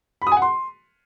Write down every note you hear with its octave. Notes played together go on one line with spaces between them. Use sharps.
B5
D#6
G#5
F#5
C6